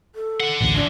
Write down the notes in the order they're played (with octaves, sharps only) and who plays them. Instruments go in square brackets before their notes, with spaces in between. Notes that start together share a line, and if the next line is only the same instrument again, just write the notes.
[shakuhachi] A4
[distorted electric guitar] D3 F#5
[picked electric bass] A1 D2
[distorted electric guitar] E3 F3 [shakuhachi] D4